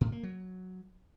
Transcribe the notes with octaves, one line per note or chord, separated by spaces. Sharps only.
A2
A#3
F#3